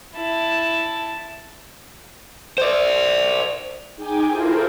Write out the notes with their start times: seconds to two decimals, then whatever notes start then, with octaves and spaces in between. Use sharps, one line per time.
0.16 E4 A5
2.58 C5 D5
3.96 D#4 G#4 G5 G#5 D6
4.27 E4 F4 A4 A#4 C5